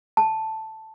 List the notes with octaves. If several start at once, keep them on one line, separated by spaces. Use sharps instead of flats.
A5